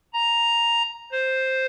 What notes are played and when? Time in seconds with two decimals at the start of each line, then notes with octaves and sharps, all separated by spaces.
0.13 A#5
1.12 C5